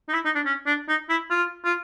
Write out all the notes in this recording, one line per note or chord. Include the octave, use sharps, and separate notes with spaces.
D#4
E4
D#4
D4
C#4
D4
D#4
E4
F4
F4